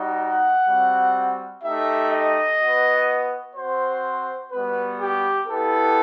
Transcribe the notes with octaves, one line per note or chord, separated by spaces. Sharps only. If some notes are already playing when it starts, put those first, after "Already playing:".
Already playing: G3 D#4 F#4
F#5
G3 C4 F#4
A3 D#4 G4 E5
D#5
B3 F#4
C4 F#4 C5
G3 B3 F#4 B4
G4
B3 E4 G4 A4